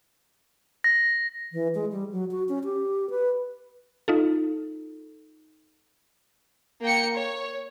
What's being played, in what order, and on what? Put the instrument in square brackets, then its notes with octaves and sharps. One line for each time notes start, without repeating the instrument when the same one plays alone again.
[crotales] A#6
[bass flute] E3
G#3
G3
F#3
F#4
C#4
G4
B4
[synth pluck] D#4 F4 A4
[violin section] A#3 G5 C#7
C#5